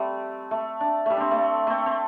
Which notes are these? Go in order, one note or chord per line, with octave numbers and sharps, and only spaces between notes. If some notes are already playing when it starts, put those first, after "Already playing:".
Already playing: G3 A3 C4
A3
D4
G3 A3
C4 D4
A3
A3 C4
C4